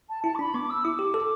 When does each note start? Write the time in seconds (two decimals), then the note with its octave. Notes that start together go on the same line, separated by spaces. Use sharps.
0.09 A5
0.24 E4 A5
0.34 D6
0.39 D4 B5
0.54 B3 D6
0.69 E6
0.84 E4 D6
0.99 G4
1.14 A4